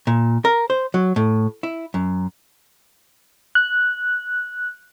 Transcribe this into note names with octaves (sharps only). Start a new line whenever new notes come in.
A#2
A#4
C5
F#3
A2
E4
F#2
F#6